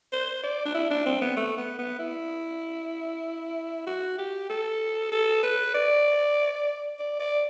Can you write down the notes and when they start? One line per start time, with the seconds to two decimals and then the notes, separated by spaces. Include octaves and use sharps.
0.12 C5
0.43 D5
0.65 D4
0.74 E4
0.90 D4
1.06 C4
1.21 B3
1.37 A3
1.57 B3
1.79 B3
1.99 E4
3.86 F#4
4.18 G4
4.50 A4
5.12 A4
5.43 B4
5.74 D5
6.99 D5
7.19 D5